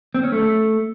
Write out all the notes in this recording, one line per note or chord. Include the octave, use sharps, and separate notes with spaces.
C4
C#4
A3